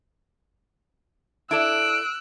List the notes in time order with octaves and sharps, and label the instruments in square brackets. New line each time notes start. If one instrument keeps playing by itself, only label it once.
[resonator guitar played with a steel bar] E4 A4 D5 [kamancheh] E6 F#6 [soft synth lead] D7